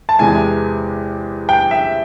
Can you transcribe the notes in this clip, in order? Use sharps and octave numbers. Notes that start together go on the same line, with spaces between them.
A5
E2 C3 E3 G#3 G#5
G5
E5